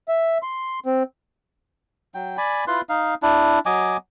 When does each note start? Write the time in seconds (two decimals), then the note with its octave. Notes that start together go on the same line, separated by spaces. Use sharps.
0.09 E5
0.43 C6
0.86 C4
2.15 F#3 G5
2.38 D5 G#5 B5
2.67 E4 F4 B4 C6
2.89 D#4 F5
3.22 D4 E4
3.66 F#3 D#5 G#5 D6